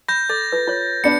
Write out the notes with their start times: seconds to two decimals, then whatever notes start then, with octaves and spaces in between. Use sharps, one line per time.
0.08 B5 G6 A#6
0.30 A4 A6
0.52 F4 B4
0.67 F4 C#5
1.04 B3 D4 B5 C#7